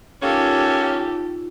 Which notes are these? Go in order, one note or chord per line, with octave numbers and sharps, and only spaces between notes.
A#3 C#4 D#4 F4 G4 A4